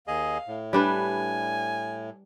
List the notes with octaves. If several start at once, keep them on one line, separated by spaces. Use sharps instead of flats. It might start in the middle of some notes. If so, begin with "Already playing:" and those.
D#2 G#4 D#5 F5
A2
G3 D4 B4 G#5